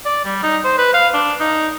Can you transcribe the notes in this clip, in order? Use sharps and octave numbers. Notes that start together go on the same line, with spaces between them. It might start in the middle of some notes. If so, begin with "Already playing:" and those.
D5
G3
D#4
C5
B4
F5
D4
D#4